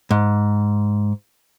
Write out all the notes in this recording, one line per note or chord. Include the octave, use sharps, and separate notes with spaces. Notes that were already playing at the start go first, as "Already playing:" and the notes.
G#2